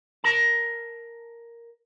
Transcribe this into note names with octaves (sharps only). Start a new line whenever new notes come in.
A#4 A5